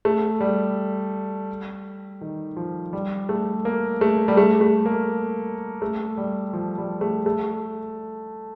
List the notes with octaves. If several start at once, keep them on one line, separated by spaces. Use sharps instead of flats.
A3
G3
D#3
F3
G3
A3
A#3
A3
G3
A3
A3
A#3
A3
G3
F3
G3
A3
A3